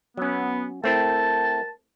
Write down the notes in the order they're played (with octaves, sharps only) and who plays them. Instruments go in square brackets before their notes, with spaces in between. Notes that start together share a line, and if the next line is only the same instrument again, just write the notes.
[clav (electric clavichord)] F#3 C#4 [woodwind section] B3
[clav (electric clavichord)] A3 C4 E4 [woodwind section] A#4 G5 A5